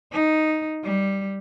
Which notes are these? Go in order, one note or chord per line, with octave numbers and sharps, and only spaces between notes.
D#4
G3